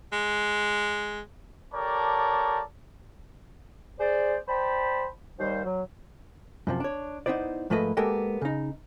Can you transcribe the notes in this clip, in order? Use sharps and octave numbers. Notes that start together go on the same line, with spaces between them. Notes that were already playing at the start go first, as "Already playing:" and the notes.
G#3
G4 A4 A#4 C#5 D5 A5
G#4 C5 D5
C5 D5 G5 A5 B5
D#2 G3 C5
F#3
F#2 C3 F3
D4 C#5
B3 D#4 E4 C5 D5
G#2 F3 A3 A#3 B4 D#5
G#3 A#3 B3 G4 A4 A#4
C#3 D#4